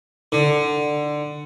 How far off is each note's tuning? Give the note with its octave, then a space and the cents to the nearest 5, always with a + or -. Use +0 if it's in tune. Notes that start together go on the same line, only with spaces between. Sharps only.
D3 +15